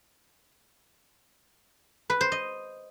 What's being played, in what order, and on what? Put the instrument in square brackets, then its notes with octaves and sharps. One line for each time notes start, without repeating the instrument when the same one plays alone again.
[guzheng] B4
C5
D#5